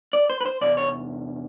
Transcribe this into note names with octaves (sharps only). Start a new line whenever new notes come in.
D5
C5
B4
C5
E2 C3 D5
C#5